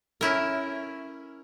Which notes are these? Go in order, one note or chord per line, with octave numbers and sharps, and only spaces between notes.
C#4 E4 A#4